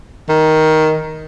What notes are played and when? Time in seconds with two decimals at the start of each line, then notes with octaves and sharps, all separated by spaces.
0.29 D#3